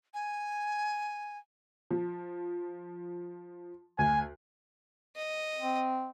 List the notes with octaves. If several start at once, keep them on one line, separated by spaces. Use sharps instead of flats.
G#5
F3
D2 G#5
D#5
C4